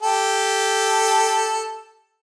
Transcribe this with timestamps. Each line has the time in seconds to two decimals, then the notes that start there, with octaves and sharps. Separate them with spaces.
0.02 G4 A4